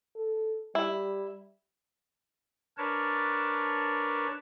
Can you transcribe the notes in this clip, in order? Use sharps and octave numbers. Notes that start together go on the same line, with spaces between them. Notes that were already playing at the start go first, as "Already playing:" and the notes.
A4
G3 E4
D4 A#4 B4 C#5 A5